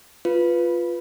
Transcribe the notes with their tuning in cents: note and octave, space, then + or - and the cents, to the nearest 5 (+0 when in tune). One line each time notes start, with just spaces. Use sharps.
F4 +0 B4 +0